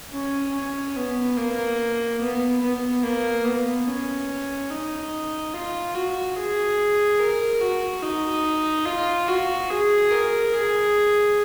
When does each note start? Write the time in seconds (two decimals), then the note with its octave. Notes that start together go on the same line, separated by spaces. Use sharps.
0.13 C#4
0.54 C#4
0.96 B3
1.37 A#3
2.21 B3
2.62 B3
3.03 A#3
3.45 B3
3.87 C#4
4.70 D#4
5.54 F4
5.95 F#4
6.36 G#4
7.19 A#4
7.61 F#4
8.03 D#4
8.86 F4
9.28 F#4
9.69 G#4
10.11 A#4
10.53 G#4